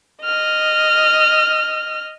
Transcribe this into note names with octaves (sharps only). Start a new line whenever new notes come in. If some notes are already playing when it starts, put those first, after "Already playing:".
D#5 F6